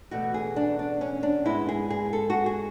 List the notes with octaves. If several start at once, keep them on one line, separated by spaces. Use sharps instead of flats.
E2 B2 A3 F#4
G#4
D4
D4
C#4
D4
G#2 G#3 B3 E4
G#4
G#4
A4
F#4
G#4